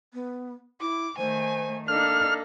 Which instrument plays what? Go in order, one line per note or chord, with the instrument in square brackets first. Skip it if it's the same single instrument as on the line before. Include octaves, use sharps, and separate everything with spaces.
[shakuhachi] B3
[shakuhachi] E4 [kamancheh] D6
[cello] D#3 A3 [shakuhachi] C5 [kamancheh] G#5
[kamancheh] A#3 [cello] D4 D#4 [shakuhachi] A4 [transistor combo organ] F6